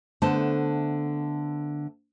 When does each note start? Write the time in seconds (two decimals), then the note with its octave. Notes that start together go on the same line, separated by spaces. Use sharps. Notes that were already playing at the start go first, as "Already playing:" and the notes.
0.22 D3 A3 B3 C5 A5